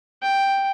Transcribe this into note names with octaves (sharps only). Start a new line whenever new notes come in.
G5